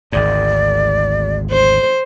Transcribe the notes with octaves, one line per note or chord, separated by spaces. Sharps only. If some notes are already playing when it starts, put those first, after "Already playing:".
G#1 D2 G#2 D5
C5